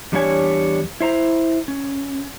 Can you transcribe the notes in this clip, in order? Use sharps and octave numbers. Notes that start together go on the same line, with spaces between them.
E2 G3 D4 E4 C#5 G#5
E4 C5 A#5
C#4